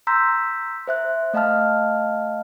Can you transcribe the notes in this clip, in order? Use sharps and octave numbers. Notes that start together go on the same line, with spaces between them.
A#5 C6 E6 G6 B6
C5 E5 F#6
A3 D#5 F5 A5 F6